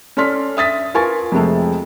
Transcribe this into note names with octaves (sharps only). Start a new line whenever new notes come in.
C#4 A4 D5 C6 F6 B6
E5 D#6 A6 B6
F4 A#4 B4 G#5 C#6 A6
F2 C3 G#3 A3